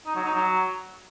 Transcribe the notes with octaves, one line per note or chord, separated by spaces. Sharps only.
D#4
F#3
D#4
F#3